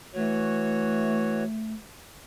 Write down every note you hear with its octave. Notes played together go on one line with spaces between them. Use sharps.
E3 A3 F#4 C#5